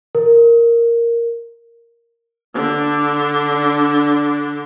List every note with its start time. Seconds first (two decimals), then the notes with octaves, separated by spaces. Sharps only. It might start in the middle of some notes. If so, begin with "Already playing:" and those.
0.15 A#4
2.54 D3 D4